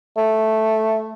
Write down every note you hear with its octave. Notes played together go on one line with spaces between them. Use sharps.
A3